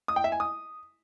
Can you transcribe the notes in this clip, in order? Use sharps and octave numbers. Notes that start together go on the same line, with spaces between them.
D#6
G5
E5
G#5
D#6